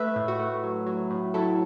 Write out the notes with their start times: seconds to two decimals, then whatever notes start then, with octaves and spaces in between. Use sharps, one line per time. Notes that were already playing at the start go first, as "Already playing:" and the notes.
Already playing: A3 B4 E5
0.16 A2
0.28 F#4
0.40 A3
0.64 F#3
0.87 F#3
1.11 A2
1.34 F#3 E4 A4